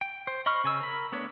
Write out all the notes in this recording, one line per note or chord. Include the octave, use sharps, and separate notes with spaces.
G5
C5
D#5 B5 C#6 F6
C#3 G#5 E6
A#4 B5
A3 B3 D4 C#5